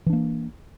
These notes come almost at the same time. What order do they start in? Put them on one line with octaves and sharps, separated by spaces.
E3 D4 A#3